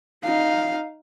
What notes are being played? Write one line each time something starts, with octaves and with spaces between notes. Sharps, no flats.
D#4 F5